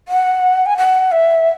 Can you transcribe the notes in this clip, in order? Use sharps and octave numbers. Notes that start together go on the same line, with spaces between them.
F#5
G#5
F#5
E5